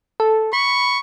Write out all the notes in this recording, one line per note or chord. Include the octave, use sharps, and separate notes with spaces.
A4
B5 C#6